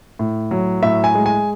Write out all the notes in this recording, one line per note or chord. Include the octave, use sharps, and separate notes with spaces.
A2
F#3
A2 E5
G#5
G#3
G#5